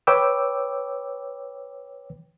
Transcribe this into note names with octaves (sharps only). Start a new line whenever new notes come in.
B4 C#5 G5 D6 E6